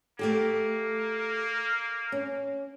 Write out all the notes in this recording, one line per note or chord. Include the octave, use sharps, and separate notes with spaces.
A3 A#3 G4 A4
C#4